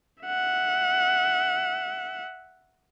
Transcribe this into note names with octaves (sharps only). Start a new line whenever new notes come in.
E5 F#5